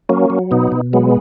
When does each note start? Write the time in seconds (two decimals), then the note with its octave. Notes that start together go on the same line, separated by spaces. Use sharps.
0.09 F#3 A#3 C#4
0.30 F#3
0.51 B2 B3 D#4
0.72 B2
0.93 F#3 G#3 B3